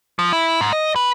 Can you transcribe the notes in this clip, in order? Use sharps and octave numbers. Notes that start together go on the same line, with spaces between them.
F3
E4
G#2
D#5
B4